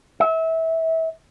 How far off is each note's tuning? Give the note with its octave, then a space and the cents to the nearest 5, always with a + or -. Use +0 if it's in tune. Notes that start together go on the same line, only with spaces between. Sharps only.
E5 -25